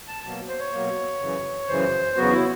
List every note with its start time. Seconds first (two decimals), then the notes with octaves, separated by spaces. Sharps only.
0.08 A5
0.24 B2 F#3 A#3 A5
0.48 C5
0.60 C#5
0.72 B2 F#3 A#3
1.20 F#2 C#3 E3
1.69 F#2 C#3 E3 C5
2.17 E2 C#3 F#3 B3 F#4
2.33 E4